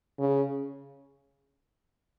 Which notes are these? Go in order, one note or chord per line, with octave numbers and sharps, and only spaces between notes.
C#3